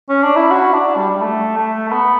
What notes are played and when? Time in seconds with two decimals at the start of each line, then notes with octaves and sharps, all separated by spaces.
0.09 C#4
0.23 D4
0.36 E4
0.51 F#4
0.73 D4
0.97 G3
1.10 G3
1.21 A3
1.57 A3
1.89 A3
1.92 B3